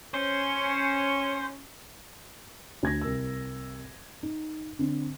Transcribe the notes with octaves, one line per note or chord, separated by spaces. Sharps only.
C#4 C5
D2 G#6 A#6
C2 A#4 E6
D#4
D3 C4 D4